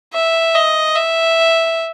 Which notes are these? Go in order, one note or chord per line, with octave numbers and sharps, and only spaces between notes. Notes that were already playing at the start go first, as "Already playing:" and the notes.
E5
D#5
E5